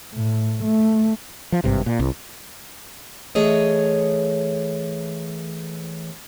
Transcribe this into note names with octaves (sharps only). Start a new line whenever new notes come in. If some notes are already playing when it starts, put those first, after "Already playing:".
A2
A3
F3
G#1 G2 C3
A#2
C2
E3 A3 G#4 C#5 D#5